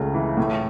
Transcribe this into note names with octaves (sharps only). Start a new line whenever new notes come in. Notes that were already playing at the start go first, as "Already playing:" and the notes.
Already playing: C#2 C#3 A3
E3
A2